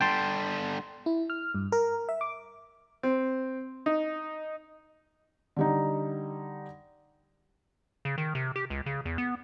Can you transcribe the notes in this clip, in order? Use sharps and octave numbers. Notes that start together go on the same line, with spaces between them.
D3 G3 G5 A5 C6
E4
F6
G2
A#4
E5
D6
C4
D#4
D3 G3 D#4
C#3
D#3
C3
G4
C#2
C#3
E2
B3